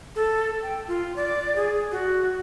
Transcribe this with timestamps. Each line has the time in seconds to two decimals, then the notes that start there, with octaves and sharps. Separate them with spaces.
0.16 A4
0.62 G5
0.88 F4
1.16 D5
1.56 G#4
1.92 F#4